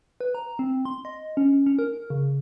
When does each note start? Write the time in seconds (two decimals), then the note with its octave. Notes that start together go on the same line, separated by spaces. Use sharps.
0.21 B4
0.35 A#5
0.59 C4
0.85 C6
1.05 D#5
1.37 C#4
1.66 C#4
1.79 A#4
2.10 C#3